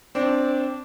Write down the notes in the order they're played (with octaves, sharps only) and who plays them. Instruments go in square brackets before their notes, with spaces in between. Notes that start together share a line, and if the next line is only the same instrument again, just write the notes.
[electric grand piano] C4 [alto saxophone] D4